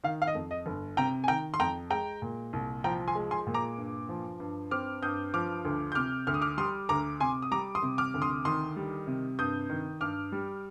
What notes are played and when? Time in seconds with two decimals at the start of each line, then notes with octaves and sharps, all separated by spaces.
0.04 D#3 F5
0.22 F5
0.27 D#5
0.35 F2
0.51 D#5
0.66 G1
0.97 C3 G5 A#5
1.24 G#5
1.28 D#3 G5 A#5
1.54 C6
1.60 F2 G5 A#5
1.90 G#3 G5 A#5
2.22 A#2
2.53 C2
2.84 F3 G5 A#5
3.08 G#5 C6
3.15 G#3
3.31 G#5 C6
3.47 A#2
3.54 A#5 D6
3.78 G2
4.09 F3
4.40 G2
4.71 C4 D6 F6
5.02 G2 D#6 G6
5.34 F3 D6 F6
5.65 D2
5.92 G6
5.95 C3 D6 F6
6.27 D2 F6
6.34 D#6
6.42 D6 F6
6.58 G3 C6 D#6
6.89 D2 A#5 D6
7.20 C3 G#5 C6
7.42 D#6
7.51 G3 A#5 D6
7.75 C6 D#6
7.83 C3
7.98 D6 F6
8.14 D2
8.22 C6 D#6
8.45 D#3 C6 D#6
8.76 G3
9.07 C3
9.39 G2 D#6 G6
9.70 D#3
10.01 G2 D6 F6
10.32 G3